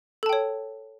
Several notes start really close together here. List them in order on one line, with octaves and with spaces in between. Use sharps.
A4 A5 G5 C#5